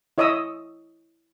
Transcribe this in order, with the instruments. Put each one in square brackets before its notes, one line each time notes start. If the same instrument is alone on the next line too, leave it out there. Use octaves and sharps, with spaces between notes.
[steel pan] E4 C#5 D#5 E5 D#6 E6